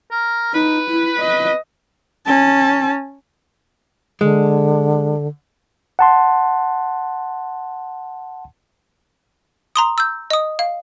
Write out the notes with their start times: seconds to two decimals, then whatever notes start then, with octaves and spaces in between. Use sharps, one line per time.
0.11 A#4
0.54 D#4 B4
0.89 E4
1.19 D#5
2.26 C#4 A5
4.21 D3 G#3
5.99 F#5 A5 C6
9.76 A#5 C6 D#6
9.98 E6 G6
10.30 D#5 D#6
10.59 F5